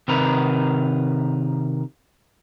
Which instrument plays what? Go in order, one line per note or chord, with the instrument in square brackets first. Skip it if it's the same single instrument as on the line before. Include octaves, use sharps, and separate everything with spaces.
[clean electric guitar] C3 D#3 A#4 B4